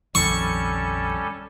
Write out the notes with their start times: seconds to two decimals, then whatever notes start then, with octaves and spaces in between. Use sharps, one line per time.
0.15 A#1 F2 D#3 G3 C#4 A4 C#6